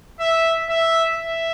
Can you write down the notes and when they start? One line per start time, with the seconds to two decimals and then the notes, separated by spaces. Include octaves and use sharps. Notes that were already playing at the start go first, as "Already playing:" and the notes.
0.20 E5
0.69 E5
1.17 E5